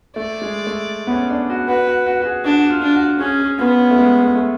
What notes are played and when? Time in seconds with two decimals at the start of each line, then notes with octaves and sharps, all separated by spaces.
0.16 A3 D5
0.42 G#3
0.67 A3
1.07 B3
1.11 C#4
1.30 D4
1.50 F#4
1.68 F#4 B4
1.88 F#4
2.06 F#4
2.22 F#4
2.25 G#4
2.44 D4 F#4
2.58 F#4
2.70 F4
2.82 D4
2.96 F#4
3.20 C#4 G#4
3.39 G#4
3.58 B3 F4
3.77 C#4
3.90 A3
3.97 G#3
4.22 A3
4.35 A3